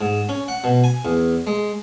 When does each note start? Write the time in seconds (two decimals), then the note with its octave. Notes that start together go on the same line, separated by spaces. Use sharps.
0.01 G#2
0.29 C#4
0.48 F#5
0.64 B2
0.84 G#5
1.05 E2
1.47 G#3